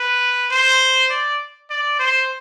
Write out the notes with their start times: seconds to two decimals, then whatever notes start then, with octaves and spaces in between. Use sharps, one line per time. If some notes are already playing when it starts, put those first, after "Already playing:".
Already playing: B4
0.51 C5
1.10 D5
1.70 D5
1.99 C5